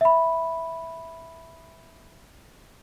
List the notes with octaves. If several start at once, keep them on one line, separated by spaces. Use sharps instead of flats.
E5 B5